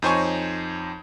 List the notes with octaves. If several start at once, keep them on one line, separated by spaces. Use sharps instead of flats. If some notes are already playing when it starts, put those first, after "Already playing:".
F2 D#4 C5 C#5 G#5 C#6